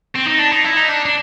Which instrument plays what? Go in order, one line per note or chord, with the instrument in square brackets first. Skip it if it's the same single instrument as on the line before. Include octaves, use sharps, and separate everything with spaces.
[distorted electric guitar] C4
D#4
D4
D#4
E4
D#4
D4
D4